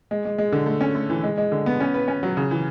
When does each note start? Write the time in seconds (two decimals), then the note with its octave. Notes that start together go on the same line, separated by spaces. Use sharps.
0.11 G#3
0.25 G#3
0.38 G#3
0.52 D3
0.66 A3
0.81 C#4
0.95 A3
1.10 E3
1.24 G#3
1.37 G#3
1.52 D3
1.66 B3
1.80 C#4
1.94 B4
2.08 C#4
2.23 F#3
2.37 C#3
2.51 E3